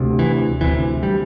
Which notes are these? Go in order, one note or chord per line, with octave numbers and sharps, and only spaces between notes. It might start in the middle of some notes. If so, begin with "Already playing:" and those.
Already playing: D2 C3
E3
D2 C3 E3
G3